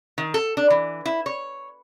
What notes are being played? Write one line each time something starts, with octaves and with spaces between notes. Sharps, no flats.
D#3
A4
D4
E3
E4
C#5